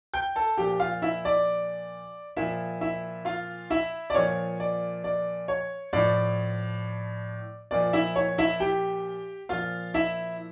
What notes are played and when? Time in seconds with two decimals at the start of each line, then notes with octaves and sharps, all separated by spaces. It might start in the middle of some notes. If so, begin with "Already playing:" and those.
0.14 G5 G6
0.36 A4 A5
0.57 A#2 F3 G4 G5
0.80 F4 F5
1.02 E4 E5
1.25 D5
2.36 A#2 F3 E4 E5
2.81 E4 E5
3.25 F4 F5
3.70 E4 E5
4.10 D5
4.15 A#2 F3 C#5
4.60 D5
5.04 D5
5.48 C#5
5.93 A2 F3 D5
7.71 A#2 F3 D5
7.93 E4 E5
8.16 C#5
8.38 E4 E5
8.60 G4 G5
9.49 A#2 F3 F4 F5
9.94 E4 E5